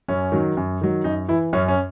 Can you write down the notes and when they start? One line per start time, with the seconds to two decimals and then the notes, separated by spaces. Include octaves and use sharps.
0.08 F#2 C#4
0.32 D#3 F#3
0.57 F#2
0.81 D#3 F#3
1.04 F#2 D#4
1.28 E3 E4
1.53 F#2 C#4
1.68 C#4